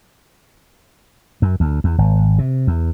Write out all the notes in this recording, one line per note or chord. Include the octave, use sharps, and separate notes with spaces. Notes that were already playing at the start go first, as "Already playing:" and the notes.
F#2
D2
E2
G#1
C3
E2